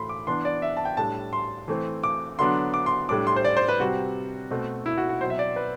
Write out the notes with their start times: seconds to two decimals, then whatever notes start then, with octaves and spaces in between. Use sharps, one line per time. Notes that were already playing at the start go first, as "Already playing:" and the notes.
Already playing: A2 E3 A3 B5 C6
0.09 D6
0.27 E3 B3 D4 C6
0.45 D5
0.62 E5
0.77 A5
0.85 G5
0.97 A2 G3 D4 A5
1.33 C6
1.68 E3 A3 C4
2.03 D6
2.39 D3 F#3 B3 D4 C6
2.74 D6
2.86 C6
3.09 A2 G3 D4 D6
3.27 C6
3.36 C5
3.44 D5
3.57 C5
3.68 B4
3.80 C3 G3 C4 F#4
4.51 B2 A3 C4
4.86 E4
4.98 F#4
5.09 F#4
5.21 B2 F#3 C4 C5
5.30 E5
5.39 D5
5.56 B4